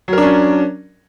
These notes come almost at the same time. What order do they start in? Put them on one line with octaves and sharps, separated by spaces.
F#3 A#4 D4 C#4